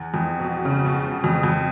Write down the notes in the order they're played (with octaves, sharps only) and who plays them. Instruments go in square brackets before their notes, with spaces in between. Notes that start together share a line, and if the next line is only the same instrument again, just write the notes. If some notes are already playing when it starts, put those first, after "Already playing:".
Already playing: [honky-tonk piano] E2
F2
B2
C#3
B2
B2
F2
F2